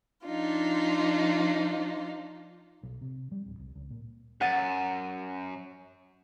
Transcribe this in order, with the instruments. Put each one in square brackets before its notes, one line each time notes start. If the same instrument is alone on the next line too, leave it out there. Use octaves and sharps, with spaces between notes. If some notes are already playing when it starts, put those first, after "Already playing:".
[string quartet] F3 D4 D#4 F4
[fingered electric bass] B1
C3
G3
D1
C2
C#2
A#2
[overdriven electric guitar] F#2 [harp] F#5 A6 D#7